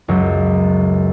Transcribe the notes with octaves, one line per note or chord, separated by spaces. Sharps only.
C#2 F#2 F#3